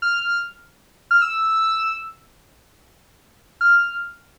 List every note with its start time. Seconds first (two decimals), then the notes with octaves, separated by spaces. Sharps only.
0.02 F6
1.11 F6
1.22 E6
3.61 F6